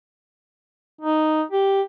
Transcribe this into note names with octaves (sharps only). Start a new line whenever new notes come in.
D#4
G4